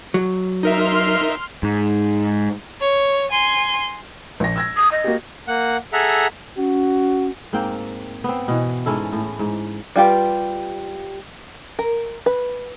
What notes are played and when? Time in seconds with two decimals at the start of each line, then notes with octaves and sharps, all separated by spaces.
0.14 F#3
0.63 D#4 A#4 E5 C6 F6
1.63 G#2
2.80 C#5
3.31 G#5 C6
4.40 A#1 A#6
4.56 E6 G#6 A#6
4.77 D#6
4.92 D#5
5.04 A#3 F#4 G4
5.48 A#3 F#5
5.93 G#4 A4 E5 F#5 A#5
6.57 C#4 F#4
7.53 G#2 A#3 C4 G5
8.24 B3 C4
8.48 B2 E3
8.86 G#2 C#4 E4 A4
9.13 A2
9.39 G#2
9.96 G3 F4 G4 B4
11.79 A#4
12.26 B4